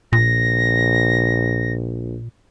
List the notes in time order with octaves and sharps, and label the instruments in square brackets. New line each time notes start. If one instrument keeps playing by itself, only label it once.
[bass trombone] A#1 [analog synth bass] A#2 [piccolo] A#6